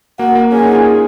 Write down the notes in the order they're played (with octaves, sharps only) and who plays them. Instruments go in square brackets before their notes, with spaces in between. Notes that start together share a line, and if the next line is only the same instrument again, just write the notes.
[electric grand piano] A#3 [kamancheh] F#4
[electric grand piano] A#3
[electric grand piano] C#4 [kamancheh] G#4
[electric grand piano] D#4
F4
G#4